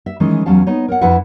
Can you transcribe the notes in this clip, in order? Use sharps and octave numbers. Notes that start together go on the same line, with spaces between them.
E5
D#3 E3 G#3 C#4
E2 F#3 C#4 F5 A5
B3 D#4 C#5
A#4 C#5 F#5
F2 D4 E4 B4 E5 F#5